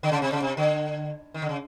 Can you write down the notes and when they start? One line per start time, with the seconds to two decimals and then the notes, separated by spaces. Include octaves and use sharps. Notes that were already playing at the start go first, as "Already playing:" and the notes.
0.03 D3
0.12 C#3
0.22 C3
0.32 C#3
0.42 C3
0.57 D3
1.34 D#3
1.42 D3
1.49 C#3